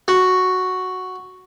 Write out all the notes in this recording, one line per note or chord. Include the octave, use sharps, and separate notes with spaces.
F#4